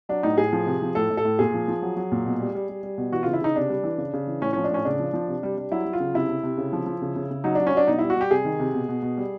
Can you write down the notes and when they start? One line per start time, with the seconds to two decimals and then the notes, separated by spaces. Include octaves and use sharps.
0.09 F#3 D4
0.23 A2 D#4
0.38 A2 G#4
0.53 F3
0.66 C3
0.82 F3
0.95 A2 A4
1.10 A2
1.17 A4
1.25 A2
1.39 A#2 G#4
1.54 F3
1.68 F3
1.82 F#3
1.96 F#3
2.12 A#2
2.26 B2
2.40 G3
2.55 G3
2.69 G3
2.83 G3
2.98 B2
3.12 E3 F#4
3.23 C#3 F4
3.33 E4
3.41 C#3 D#4
3.55 C3 D4
3.69 G3
3.83 E3
3.98 C#3
4.14 C#3
4.27 E3
4.41 A2 C#4
4.53 F3 C#4
4.64 D4
4.70 A2 C#4
4.85 C#3 D4
4.99 F3
5.13 F3
5.28 C3
5.43 G3
5.58 G3
5.72 F#3 E4
5.85 F#3
5.93 F4
6.00 C#3
6.14 C3 E4
6.29 C3
6.43 C3
6.58 C#3
6.73 F3
6.86 F3
7.02 C#3
7.16 C#3
7.31 C#3
7.44 F#3 D#4
7.55 F#3 D4
7.67 C#4
7.73 F#3 D4
7.87 B2 D#4
7.99 G3 E4
8.10 F#4
8.17 G3 G4
8.31 C3 G#4
8.45 D#3
8.59 C3
8.74 B2
8.89 B2
9.02 B2
9.18 G3